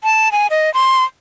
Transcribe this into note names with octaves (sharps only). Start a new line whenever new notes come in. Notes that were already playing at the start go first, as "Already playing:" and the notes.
A5
G#5
D#5
C6